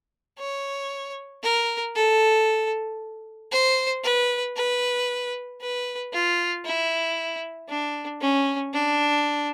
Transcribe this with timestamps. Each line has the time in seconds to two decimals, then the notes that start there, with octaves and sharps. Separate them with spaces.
0.39 C#5
1.43 A#4
1.95 A4
3.52 C5
4.04 B4
4.56 B4
5.61 B4
6.13 F4
6.65 E4
7.69 D4
8.21 C#4
8.73 D4